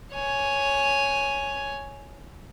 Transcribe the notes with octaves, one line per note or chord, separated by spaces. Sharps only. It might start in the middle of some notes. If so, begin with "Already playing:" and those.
C#5 G#5